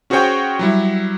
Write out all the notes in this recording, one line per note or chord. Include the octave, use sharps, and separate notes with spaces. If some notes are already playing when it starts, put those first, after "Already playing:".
C#4 F#4 G#4 C5 C#5 G5
F#3 G3 E4